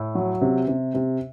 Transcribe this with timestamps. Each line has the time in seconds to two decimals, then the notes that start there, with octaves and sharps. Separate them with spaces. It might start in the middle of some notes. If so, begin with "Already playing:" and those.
Already playing: A2
0.15 F#3
0.41 C3
0.68 C3
0.94 C3